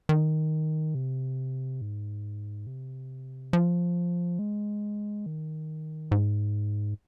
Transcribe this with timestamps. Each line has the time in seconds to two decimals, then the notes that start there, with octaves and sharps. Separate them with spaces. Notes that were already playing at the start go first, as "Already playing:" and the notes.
0.09 D#3
0.95 C3
1.81 G#2
2.67 C3
3.53 F3
4.39 G#3
5.26 D#3
6.11 G#2